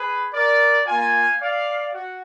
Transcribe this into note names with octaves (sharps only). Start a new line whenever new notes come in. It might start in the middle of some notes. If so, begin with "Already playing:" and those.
Already playing: G#4 B4
A#4 D5
A#3 F4 F5 G#5
D5 F5
F#4